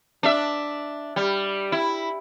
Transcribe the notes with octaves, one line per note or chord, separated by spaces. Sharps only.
D4 E5
G3
E4